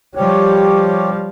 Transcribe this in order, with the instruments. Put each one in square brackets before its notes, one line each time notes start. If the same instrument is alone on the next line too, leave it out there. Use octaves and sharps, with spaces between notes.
[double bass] F3 G3 [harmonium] G4 C#5